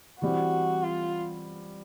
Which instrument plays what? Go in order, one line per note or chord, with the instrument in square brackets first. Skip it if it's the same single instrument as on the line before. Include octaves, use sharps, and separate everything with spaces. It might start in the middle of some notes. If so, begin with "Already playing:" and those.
[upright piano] E3 G3 C4 [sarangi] F#4
[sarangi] F4